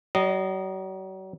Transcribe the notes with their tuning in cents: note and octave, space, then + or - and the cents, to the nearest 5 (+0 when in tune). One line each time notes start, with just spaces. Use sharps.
F#3 +40 D#5 -15